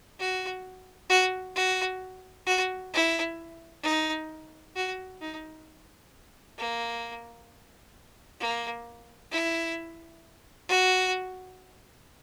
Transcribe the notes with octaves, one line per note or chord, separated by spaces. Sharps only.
F#4
F#4
F#4
F#4
E4
D#4
F#4
D#4
A#3
A#3
E4
F#4